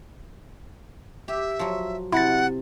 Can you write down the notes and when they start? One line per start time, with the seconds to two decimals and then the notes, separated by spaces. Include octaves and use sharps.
1.28 G4 E5
1.59 F3 F#3
2.12 C3 E4 F#5 A6